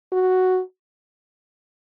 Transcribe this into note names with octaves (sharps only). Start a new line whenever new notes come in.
F#4